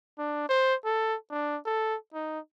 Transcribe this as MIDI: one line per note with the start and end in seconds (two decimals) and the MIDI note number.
0.18 0.47 62
0.49 0.75 72
0.85 1.16 69
1.31 1.57 62
1.66 1.95 69
2.14 2.39 63